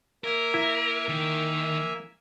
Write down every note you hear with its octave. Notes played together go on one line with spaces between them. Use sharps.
A#3 A#4 E5 G#5
E4
D#3